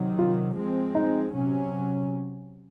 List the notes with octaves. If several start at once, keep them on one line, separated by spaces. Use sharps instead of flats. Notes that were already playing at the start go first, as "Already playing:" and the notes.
Already playing: C3 D#3 F#3
F4
F3 G#3 C4
D#4
C3 F#3 C#4